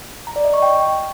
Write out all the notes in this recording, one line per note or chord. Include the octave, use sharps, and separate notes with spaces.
A#5
D5
D#5
C#6
G5